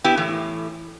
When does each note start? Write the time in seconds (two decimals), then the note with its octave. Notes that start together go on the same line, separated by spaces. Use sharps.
0.04 B3 E4 G4
0.17 A2 E3